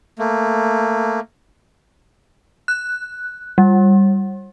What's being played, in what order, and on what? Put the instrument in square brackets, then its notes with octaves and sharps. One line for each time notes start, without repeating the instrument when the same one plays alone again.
[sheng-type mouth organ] A3 A#3
[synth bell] F#6
G3